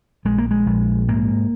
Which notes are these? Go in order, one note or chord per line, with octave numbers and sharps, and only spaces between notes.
A#1 G#3
A#3
G#3
A#1
G#2 A#3